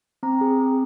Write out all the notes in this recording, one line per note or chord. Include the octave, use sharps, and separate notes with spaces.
C4 A#5
G#4
C4